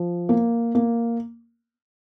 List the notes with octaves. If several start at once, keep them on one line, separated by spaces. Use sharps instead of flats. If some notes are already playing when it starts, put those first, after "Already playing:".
Already playing: F3
A#3
A#3